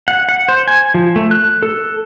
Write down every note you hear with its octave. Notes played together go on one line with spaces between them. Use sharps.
F#5
F#5
C5
G#5
F3
A3
F#6
A4